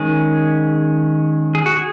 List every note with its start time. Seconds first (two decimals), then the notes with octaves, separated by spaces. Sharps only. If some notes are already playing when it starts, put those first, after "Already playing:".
Already playing: D#3 G#3 C#4 G#4
1.55 G#4
1.66 F#4
1.76 G#4